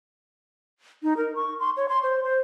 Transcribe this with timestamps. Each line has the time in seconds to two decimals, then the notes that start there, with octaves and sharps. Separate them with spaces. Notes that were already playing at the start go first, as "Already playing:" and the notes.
1.03 D#4
1.17 A#4
1.35 C#6
1.60 C6
1.77 C#5
1.89 C6
2.03 C5
2.23 C5